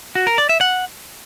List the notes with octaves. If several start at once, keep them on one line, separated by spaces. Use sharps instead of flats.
F#4
A#4
D5
E5
F#5